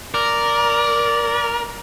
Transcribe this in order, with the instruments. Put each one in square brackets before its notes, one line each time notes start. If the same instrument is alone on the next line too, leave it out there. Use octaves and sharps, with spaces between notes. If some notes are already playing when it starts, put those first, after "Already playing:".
[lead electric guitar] A#4 [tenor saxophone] D5